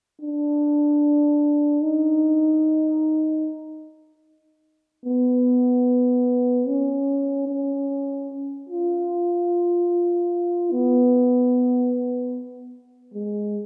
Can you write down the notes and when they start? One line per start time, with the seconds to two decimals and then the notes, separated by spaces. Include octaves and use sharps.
0.21 D4
1.83 D#4
5.06 B3
6.67 C#4
7.48 C#4
8.69 F4
10.71 B3
13.14 G#3